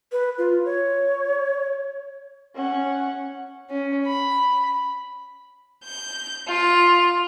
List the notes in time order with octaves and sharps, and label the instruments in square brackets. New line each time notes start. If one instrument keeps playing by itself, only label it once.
[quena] B4
F4
C#5
[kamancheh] C#4 F#5
[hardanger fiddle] C#4
B5
[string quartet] G6
F4